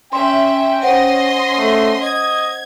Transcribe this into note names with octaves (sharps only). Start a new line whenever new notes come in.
C#4 E5 G5 C6
C#4 C5 D#5 F#5 C6
A3
D#5 G#6